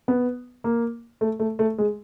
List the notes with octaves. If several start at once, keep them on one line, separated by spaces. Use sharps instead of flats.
B3
A#3
A3
A3
A3
G#3